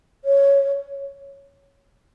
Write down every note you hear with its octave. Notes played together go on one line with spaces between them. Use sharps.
C#5